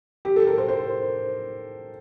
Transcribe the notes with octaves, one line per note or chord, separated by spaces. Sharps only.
G4
A4
A#4
C5
C5